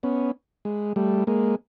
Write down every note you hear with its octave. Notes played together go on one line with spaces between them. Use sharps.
B3 C#4
G#3
G3 A3
G#3 A#3